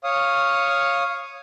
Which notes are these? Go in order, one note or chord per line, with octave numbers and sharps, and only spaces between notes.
C#5 F5 D#6